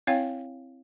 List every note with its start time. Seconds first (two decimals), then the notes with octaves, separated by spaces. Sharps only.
0.07 C4 E4 C#5 F5 G5